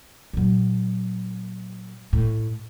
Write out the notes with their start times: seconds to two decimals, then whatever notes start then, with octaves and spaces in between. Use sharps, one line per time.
0.33 A#2 F#3
2.13 A2